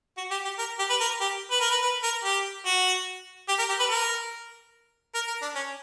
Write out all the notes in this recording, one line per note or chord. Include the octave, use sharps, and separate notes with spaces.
F#4
G4
G4
A#4
G4
B4
A#4
G4
B4
A#4
B4
B4
A#4
G4
F#4
G4
A#4
G4
B4
A#4
A#4
A#4
D4
C#4